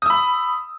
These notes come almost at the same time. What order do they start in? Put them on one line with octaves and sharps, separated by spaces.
D#6 E6 B5